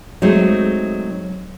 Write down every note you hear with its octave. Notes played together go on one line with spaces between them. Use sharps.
F#3 G#3 A3 C4 D#4